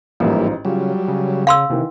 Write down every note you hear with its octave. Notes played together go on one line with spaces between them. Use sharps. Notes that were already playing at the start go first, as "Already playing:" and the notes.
A1 G#2 F3 G3 A#3 E4
C#3 F#3 G3 F4
C#3
F5 C6 E6
C3 D#3 E3